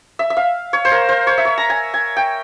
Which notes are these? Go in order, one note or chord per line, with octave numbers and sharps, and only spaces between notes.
E5
E5
F5
C#5
C5
A#4
C5
C#5
E5
C#5
A#5
G#5
G#5
G5